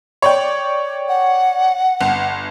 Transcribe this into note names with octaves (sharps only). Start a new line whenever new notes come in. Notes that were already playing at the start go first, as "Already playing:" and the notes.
C#5 D5 G5
F#5
G1